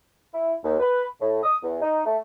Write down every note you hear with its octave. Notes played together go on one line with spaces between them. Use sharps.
E4
D#2
B4
A2
D#6
E2
D#4
A3